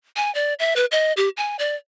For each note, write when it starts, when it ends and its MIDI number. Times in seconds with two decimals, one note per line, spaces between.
0.16 0.33 80
0.35 0.54 74
0.59 0.74 76
0.76 0.85 71
0.92 1.13 75
1.17 1.29 67
1.37 1.56 80
1.59 1.75 74